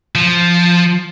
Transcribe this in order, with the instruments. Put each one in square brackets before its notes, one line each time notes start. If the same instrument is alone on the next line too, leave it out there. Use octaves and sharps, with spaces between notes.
[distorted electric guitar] F3